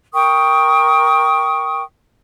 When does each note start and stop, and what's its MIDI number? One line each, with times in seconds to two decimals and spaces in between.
0.14 1.82 70
0.14 1.82 79
0.14 1.82 85
0.14 1.82 87